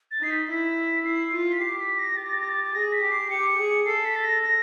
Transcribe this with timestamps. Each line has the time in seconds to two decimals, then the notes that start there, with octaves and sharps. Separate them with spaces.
0.11 A6
0.20 D#4 C7
0.30 B6
0.48 E4 B6
1.05 E4 C7
1.32 F4
1.52 B6
1.61 G4 C7
1.80 B6
1.99 A#6
2.17 G4 A6
2.25 A#6
2.33 A6
2.41 A#6
2.49 A6
2.65 A6
2.74 G#4 A#6
2.93 B6
3.02 G4
3.11 C7
3.29 G4 C#7
3.58 G#4
3.86 A4 C7
4.05 B6
4.16 A6
4.24 A#6
4.43 A#6